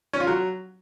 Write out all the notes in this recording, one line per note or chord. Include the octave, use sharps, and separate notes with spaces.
C#4
F4
F#3